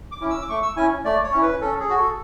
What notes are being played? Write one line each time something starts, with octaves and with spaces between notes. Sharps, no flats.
D6
C#4 E4
E6
D6
A3 C#6
E6
C#4 E4 G#5
A3 D5
C#5
C#4 E4
B4
C#4 A4
G#4
F#4
A4